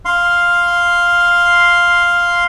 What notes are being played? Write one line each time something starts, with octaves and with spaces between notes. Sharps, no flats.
F5 C6